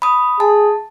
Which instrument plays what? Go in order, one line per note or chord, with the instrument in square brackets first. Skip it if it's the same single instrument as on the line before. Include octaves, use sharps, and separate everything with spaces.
[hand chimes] B5 D#6
[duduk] G#4 [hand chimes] A5